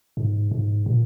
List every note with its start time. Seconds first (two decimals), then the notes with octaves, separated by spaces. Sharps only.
0.17 G#2
0.51 G#2
0.86 A#2